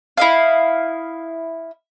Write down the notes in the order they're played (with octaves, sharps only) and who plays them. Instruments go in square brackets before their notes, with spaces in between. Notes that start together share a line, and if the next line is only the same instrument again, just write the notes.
[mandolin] E4 D#5 F5